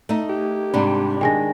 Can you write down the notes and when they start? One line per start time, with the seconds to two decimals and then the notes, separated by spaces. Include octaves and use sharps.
0.09 A3 D#4
0.29 G4
0.74 G#2 C3 G3 D4 B5
1.21 D#3 G#3 D4 G5 G#5 A#6